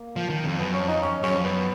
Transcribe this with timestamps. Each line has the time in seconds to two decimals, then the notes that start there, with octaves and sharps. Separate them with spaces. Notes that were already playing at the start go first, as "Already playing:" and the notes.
Already playing: A#3
0.16 F3
0.30 D#3
0.44 F2
0.58 F#2 B3
0.73 C#4
0.80 F2
0.88 D#4
1.02 C#4
1.22 F#2 C#4
1.34 F2
1.44 F#2 B3